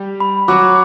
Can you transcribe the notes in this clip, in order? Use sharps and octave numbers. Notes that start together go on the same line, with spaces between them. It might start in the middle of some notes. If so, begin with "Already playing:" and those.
Already playing: G3 G4
B5
F#3 F#4 D6